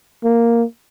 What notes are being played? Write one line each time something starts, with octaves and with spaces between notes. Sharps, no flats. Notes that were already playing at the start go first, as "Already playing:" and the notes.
A#3